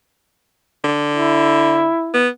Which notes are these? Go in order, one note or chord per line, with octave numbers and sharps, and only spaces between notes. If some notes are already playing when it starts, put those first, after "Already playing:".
D3
E4
B3